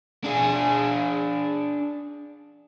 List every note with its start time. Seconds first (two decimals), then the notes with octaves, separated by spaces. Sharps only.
0.24 D4 G#4